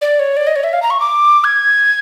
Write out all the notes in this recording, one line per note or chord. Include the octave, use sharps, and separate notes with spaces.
D5
C#5
D5
D#5
C#5
E5
F5
A#5
C#6
D6
G#6